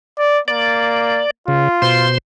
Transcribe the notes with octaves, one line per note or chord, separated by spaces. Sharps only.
D5
A#3 D5
C#3 F4
B2 C5 C6